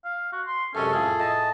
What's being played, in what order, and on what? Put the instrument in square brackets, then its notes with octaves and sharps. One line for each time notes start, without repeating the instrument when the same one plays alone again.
[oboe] F5
F#4
C6
[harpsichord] F#2 C3 G#3 [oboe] C#4 [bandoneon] A4
[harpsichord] F2 A2 [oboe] G#4
[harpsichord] A2 [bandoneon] D#5 A5